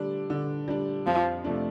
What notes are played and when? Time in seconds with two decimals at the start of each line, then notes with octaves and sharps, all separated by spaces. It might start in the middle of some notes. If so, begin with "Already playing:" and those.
Already playing: D3 G3 D4
0.30 D3
0.68 G3 D4
1.07 F2 F3
1.44 C3 F3 A3 D4